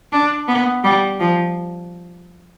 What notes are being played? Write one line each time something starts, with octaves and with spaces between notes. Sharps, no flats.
D4
B3
G3
F3